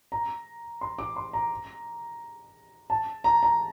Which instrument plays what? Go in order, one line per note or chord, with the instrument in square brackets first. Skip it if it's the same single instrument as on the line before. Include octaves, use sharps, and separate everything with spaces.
[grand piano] A#5
C6
D6
C6
A#5
A5
A#5
A#5